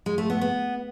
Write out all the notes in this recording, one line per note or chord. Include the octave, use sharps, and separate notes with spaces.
G#3
A3
B3
B3